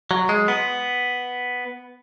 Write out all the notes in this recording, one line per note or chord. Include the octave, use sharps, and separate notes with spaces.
F#3
G#3
B3